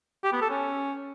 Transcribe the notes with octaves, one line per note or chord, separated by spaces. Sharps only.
G4
B3
A4
C#4